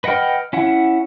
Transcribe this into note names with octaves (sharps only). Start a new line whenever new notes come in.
B4 D#5 F#5 G5 F6
C#4 E4 F#5